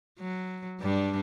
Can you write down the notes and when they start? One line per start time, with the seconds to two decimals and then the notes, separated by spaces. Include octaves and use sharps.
0.19 F#3
0.80 G2 G3 D4